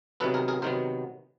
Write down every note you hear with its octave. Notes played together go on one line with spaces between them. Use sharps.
C3 D#3 F#3 B3 A4 B4
G#4 A#4
G#4 A#4
C3 D#3 F#3 B3 A#4 C5